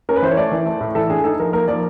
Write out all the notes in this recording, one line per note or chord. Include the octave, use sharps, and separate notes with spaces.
C#4 A#4
B4
E3 C5
C#5
A3 D5
E3
A3
A2
E3 A4
D4 G#4
D#4 A4
F3 A#4
A#3 A#4
F3 D5